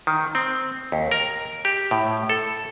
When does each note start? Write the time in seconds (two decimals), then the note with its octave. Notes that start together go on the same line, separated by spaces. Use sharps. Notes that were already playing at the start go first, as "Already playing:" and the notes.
0.07 D#3
0.35 C4
0.92 D#2
1.11 A#4
1.65 G4
1.91 A2
2.29 A4